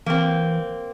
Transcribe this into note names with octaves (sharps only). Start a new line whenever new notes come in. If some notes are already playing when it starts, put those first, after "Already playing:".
E3 A#3 C4